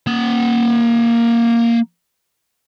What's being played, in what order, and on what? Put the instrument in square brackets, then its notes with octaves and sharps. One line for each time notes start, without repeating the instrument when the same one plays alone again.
[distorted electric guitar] A#3 F#5